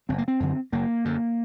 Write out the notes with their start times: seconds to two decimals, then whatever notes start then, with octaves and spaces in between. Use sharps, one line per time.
0.09 F#1 C4
0.18 A#3
0.28 C4
0.40 F#2 D3
0.72 F#1 A#3
1.05 F#2 D3